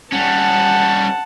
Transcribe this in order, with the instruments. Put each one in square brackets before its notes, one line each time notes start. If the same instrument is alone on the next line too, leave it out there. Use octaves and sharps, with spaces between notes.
[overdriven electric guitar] G3 C#4 [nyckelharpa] F#5 A5